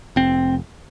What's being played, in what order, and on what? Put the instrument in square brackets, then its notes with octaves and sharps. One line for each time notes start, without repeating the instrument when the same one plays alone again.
[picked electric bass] F1 C4